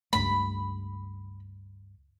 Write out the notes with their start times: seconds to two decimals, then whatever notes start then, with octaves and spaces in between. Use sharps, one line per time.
0.13 C#2 G2 A3 B5